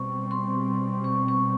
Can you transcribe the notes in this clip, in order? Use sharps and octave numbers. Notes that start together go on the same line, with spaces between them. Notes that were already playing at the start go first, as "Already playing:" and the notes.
Already playing: B2 G3 C4 C#6
C6
C#6
C#6